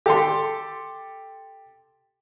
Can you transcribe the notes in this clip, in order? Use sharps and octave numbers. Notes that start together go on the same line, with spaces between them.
G4 A4 C6